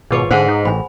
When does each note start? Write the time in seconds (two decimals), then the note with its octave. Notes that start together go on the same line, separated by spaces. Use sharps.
0.11 G#1 B2 F4 G#4 B4 C#5 D6
0.31 G#2 D3 G#4 C5 F5 F#5
0.48 D#4
0.65 A1 G#5 B5